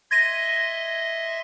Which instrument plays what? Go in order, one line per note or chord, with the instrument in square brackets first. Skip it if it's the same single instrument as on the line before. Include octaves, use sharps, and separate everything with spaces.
[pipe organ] D#5 E5 C6 [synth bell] G#6 A#6 D#7